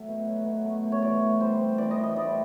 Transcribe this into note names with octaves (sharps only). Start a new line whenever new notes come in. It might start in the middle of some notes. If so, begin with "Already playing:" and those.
Already playing: F#3 A3
B2
F#3
B2
A3
B2
C#5
E3 D5
A2
G3 C5
C4
E3 D5
D#5
A2
D#5
G3 D5